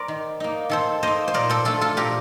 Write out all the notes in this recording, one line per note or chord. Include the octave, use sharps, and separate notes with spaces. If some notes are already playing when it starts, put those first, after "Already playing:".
Already playing: A#4 C5 D5
D#3
A#3 D#4
D#3 A4 C5
A#3 D#4 C5 D#5
C5
A#2 A#4 D5
A4 C5
A3 D4 F4 A4
F4 A4
A#2 G4 A#4